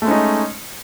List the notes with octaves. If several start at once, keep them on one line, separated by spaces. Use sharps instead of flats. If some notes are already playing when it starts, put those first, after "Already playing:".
G#3 A3 C#4 D#4